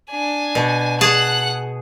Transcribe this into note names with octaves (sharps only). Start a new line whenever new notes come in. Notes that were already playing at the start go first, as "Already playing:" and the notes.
D4 G#5
B2
G#4 F#5 A5 F#6